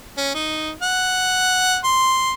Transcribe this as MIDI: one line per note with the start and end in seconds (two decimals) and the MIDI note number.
0.17 0.34 61
0.35 0.70 63
0.82 1.77 78
1.84 2.33 84